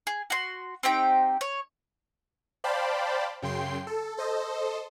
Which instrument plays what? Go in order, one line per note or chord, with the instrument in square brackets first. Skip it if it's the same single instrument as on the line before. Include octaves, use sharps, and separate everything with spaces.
[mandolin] G#4
F#4 C6
C4 D#4 G4 G5
C#5
[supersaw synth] C5 D5 F5 G5 A5 B5
F#2 C#3 G5 C6 C7
A4
A4 C5 D#5